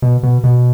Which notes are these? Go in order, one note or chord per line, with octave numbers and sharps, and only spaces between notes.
B2
B2
B2